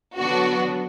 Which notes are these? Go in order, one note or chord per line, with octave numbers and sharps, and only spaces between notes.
D3 F#3 B3 D4 F#4